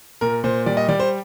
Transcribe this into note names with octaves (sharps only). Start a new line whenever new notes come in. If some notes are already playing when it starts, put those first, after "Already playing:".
A#2 A#4
A#2 C5
G3 D5
D#5
G3 D5
C5